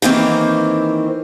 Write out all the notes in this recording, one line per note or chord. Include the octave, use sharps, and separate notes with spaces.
D#3 E3 A#3 C4